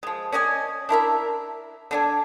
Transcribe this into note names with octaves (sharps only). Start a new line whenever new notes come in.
F3 G#3
C#4 D5 D#5 G#5
D4 E4 A#4 E5
D3 D4 G#5